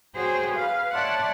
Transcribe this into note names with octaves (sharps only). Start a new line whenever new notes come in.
F#4 G#4 C5 C#5 G5
B4 F5
C#5 D5 E5 F#5 A5 C6